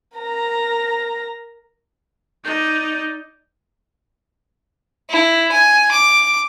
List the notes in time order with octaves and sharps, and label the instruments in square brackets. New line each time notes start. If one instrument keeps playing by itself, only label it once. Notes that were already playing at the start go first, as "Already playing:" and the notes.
[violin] A#4 A#5
[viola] D#4 [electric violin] D5 G6
[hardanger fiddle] E4
G#5
D6